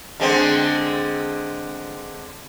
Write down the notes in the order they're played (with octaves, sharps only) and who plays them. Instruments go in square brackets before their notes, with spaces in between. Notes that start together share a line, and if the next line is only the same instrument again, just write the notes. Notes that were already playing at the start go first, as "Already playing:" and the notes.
[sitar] D3 G#3 C4